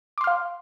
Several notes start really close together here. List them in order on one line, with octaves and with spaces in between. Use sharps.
D6 C6 F6 F5